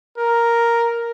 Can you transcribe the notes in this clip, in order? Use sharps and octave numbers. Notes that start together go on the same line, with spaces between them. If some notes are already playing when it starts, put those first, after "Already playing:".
A#4